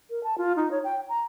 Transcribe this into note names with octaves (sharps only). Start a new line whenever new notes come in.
A#4
A5
F4
D#4
C#5
G5
A#5